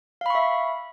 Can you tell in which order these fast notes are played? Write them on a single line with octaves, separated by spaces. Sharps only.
F5 B5 C#6 E5